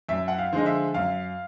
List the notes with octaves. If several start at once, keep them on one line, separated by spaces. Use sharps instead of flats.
F#2 E5
F#5
F5
D3 F3 G#3 D#5
E5
F#2 F5